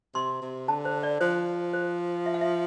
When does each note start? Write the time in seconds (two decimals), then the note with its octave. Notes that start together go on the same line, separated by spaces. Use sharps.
0.15 C3 C6
0.42 C3
0.68 D3 A5
0.85 C5
1.03 D5
1.21 F3 C5
1.74 C5
2.26 E5
2.34 F5
2.41 E5